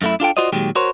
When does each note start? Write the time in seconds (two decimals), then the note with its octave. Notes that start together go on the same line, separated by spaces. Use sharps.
0.02 F#2 A3 E4
0.20 D4 F4 A4 G5
0.37 F4 F#4 C5 D5 D#5
0.53 A#2 D#3 F#3 G#3 G4
0.75 F#4 A#4 C5 C#5